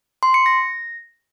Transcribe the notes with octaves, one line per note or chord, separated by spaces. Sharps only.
C6
C#7
A#6